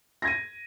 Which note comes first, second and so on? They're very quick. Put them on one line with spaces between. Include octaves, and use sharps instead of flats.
A#6 G#6 D#7